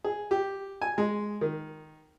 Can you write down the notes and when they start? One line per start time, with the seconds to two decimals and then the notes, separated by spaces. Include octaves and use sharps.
0.04 G#4
0.31 G4
0.82 G#5
0.98 G#3
1.41 D#3